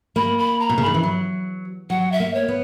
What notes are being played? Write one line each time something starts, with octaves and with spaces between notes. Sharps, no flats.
A#3 B5
B5
A#5
B2
C#3
D#3 B5
E3
F#3
F#3 F#5
E5
A#3
C#5
B3